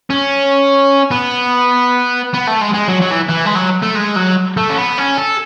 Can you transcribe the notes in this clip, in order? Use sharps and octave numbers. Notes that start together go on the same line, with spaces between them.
C#4
B3
B3
A3
G#3
G#3
F#3
F#3
E3
E3
G#3
F#3
A3
G#3
F#3
A3
C#4
B3
C#4
A4